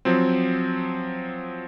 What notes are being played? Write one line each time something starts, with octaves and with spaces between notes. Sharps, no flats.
F3 F#3 C4